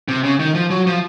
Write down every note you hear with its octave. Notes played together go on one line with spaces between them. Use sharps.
C3
C#3
D#3
F3
F#3
F3